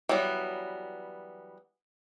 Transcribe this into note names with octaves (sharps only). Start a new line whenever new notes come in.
E3 F#3 G3 B3